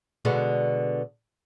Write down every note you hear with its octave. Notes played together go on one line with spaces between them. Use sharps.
B2 D3 G#3